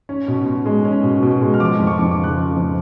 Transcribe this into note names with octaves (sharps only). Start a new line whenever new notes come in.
C#4
B2
B2
G#3
C#4
B2
B2
G#3
F6
F3 D6
F2
C#6
F2 D6
D6
C#3
F#6
F3
F2